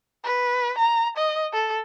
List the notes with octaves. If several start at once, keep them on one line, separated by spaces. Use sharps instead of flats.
B4
A#5
D#5
A4